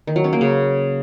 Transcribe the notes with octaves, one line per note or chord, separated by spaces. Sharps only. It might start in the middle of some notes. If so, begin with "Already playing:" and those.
D#3
F#3
C#4
A#3
C#3